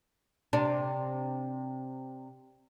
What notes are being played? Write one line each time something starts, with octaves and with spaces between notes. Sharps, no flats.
C3 D4